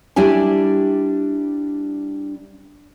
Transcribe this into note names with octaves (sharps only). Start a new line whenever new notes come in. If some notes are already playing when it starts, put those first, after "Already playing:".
G3 D4 E4 G4 G#5